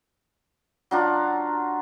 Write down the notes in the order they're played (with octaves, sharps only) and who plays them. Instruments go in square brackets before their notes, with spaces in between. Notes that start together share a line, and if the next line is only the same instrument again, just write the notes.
[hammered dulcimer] F#3 D4 F4